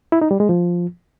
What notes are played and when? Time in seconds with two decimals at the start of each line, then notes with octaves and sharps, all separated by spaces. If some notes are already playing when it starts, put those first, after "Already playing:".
0.12 E4
0.22 D#4
0.31 G3
0.40 G#3
0.49 F3